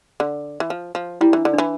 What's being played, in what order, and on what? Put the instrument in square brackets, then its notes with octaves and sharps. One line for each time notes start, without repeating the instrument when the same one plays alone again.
[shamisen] D3
E3
F3
F3
[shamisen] G3 [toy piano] E4
[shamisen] E3 [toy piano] D4
[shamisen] D3
[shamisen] E3 [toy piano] D4